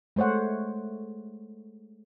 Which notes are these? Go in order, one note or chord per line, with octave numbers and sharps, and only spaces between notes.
G#3 A3 C5 C#5 F#5